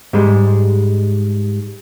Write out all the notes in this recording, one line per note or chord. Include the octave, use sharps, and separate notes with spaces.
G#2 G3 G#3